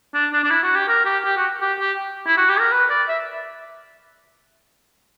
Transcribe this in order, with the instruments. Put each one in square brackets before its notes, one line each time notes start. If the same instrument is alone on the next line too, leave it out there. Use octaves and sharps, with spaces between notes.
[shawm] D4
D4
D4
E4
F#4
G4
A#4
G4
G4
F#4
G4
G4
E4
F#4
G4
A#4
B4
D5
E5